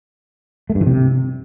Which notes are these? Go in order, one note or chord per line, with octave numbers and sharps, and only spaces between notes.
A3
G2
E3
C3